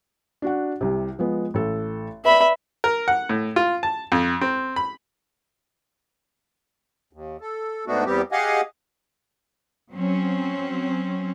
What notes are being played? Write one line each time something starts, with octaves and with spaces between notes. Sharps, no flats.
D4 F#4 F#5
C2 C3
F3 G#3 B3
A1 A4
B4 D5 E5 B5
A#4
F#5
A2
F4
A5
F2
C4
B5
D#2
A4
G#2 A3 B3 D4 F#4
E2 G3 B3 C4 G4
G4 G#4 D#5 F5 F#5 G#5
F#3 C4 C#4